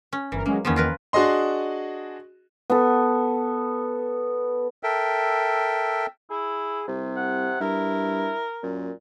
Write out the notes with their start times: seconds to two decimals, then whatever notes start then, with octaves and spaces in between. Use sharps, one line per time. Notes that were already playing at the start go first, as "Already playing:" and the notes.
0.13 C#4
0.32 G1 E3 A#4
0.46 F#3 G#3 A#3 C#4
0.65 E2 D#3 F3 A#3 B3 C#4
0.76 F4 A#4 B4
1.13 D4 F#4 G#4 D#5 C6
2.70 B3 A4
4.83 A4 A#4 E5 G5
6.30 E4 G#4
6.88 C2 C3
7.16 F#5
7.61 G2 E4 A#4
8.63 F#2 A#2